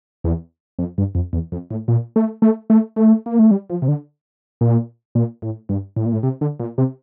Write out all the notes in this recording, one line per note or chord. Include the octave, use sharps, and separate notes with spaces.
E2
F2
G2
F2
E2
F2
A2
A#2
A3
A3
A3
A3
A#3
A3
G3
F3
C3
D3
A#2
A#2
A2
G2
A2
A#2
A2
C3
D3
A#2
C3